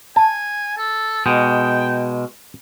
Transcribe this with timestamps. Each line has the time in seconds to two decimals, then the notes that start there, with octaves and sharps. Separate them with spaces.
0.16 G#5 A5
0.77 A4
1.26 B2 G#3 G5